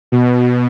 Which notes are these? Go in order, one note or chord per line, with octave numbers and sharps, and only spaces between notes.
B2